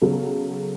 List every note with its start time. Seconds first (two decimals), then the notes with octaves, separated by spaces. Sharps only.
0.02 C#3 F#3 B3 F#4 A4